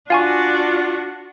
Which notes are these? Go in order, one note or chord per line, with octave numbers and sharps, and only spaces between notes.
D4 F4 F#4 F5 G#5 C#6